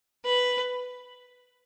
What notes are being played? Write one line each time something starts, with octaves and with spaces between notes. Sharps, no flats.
B4